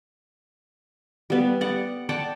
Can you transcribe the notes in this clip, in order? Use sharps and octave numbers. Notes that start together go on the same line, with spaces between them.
G3 B3
D5 F#5
D5 F#5 G5 A5